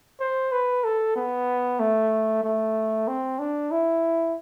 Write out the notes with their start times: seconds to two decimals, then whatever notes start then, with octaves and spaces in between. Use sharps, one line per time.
0.20 C5
0.52 B4
0.84 A4
1.16 B3
1.80 A3
2.44 A3
3.07 C4
3.39 D4
3.71 E4